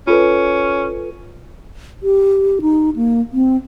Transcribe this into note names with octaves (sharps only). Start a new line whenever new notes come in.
C#4 F4 A4 B4
G4
D#4
A#3
C4